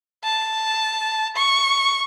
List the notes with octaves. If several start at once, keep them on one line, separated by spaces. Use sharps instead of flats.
A5
C#6